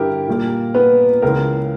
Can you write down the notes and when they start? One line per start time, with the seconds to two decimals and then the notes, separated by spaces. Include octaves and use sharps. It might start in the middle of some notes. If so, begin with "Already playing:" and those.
Already playing: G2 D3 E4 G4 A#4
0.28 A#2 G3 A#3
0.74 B3 B4
1.22 C#2 C#3 E3 A#4